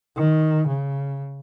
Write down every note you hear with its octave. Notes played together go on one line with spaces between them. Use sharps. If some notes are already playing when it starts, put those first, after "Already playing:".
D#3
C#3